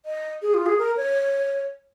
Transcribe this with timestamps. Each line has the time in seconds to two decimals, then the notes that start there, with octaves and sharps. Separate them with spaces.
0.06 D#5
0.42 G#4
0.54 F4
0.66 G#4
0.78 A#4
0.97 C#5